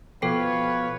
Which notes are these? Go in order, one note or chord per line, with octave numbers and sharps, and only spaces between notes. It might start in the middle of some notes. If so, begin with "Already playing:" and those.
B2 F3 A4 B4 C#5 F5 G5 C7